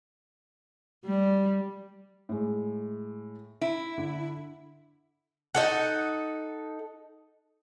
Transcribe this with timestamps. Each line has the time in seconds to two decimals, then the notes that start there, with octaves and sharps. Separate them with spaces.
1.05 G3
2.29 A2 G#3
3.61 E4 D7
3.98 D3
5.55 D#4 A4 F#5